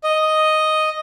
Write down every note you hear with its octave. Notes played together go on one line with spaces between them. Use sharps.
D#5